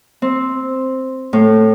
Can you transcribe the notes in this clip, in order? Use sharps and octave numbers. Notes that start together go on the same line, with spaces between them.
C4
A2